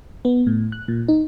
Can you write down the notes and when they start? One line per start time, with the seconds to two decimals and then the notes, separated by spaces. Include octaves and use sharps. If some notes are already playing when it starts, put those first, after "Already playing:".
0.25 B3
0.47 A2
0.72 F#6
0.88 A#2
1.08 D#4